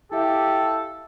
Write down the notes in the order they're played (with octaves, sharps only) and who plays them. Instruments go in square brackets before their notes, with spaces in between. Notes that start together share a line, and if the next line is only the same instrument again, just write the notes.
[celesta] E4 E5 F5 [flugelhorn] G4 [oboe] A4